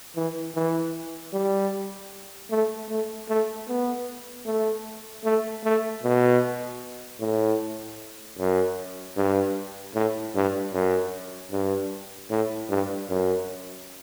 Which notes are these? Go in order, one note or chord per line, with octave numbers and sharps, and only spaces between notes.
E3
E3
G3
A3
A3
A3
B3
A3
A3
A3
B2
A2
F#2
G2
A2
G2
F#2
G2
A2
G2
F#2